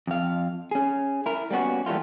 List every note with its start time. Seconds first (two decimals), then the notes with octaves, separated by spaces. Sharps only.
0.07 F2 F5
0.71 C#4 G#4
1.26 E4 A#4
1.51 G3 A#3 B3 C#4 F#4
1.86 E3 G3 A3 A#3 F4